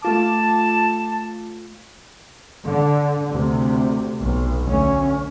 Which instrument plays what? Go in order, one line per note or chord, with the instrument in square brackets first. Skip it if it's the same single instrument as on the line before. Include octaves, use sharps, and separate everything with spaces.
[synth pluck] A3 F4 D6 [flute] A5
[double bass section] D3
D2 C3
B1
D2 C#4